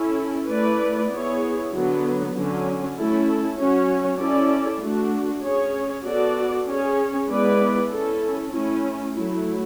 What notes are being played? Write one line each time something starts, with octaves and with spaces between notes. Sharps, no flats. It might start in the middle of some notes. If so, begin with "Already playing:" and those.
Already playing: C#4 E4 A4
A3 E4 B4 D5
B3 E4 G#4 C#5
D3 F#3 B3
D3 F#3 C#4
A3 C#4 E4 A4
F#3 C#4 F#4 C#5
C#4 E4 A4 D5
A3 D4 F#4
C#4 G#4 C#5
B3 F#4 A4 D5
C#4 G#4 C#5
G#3 B3 E4 B4 D5
C#4 E4 A4
A3 C#4 E4
F#3 A3 E4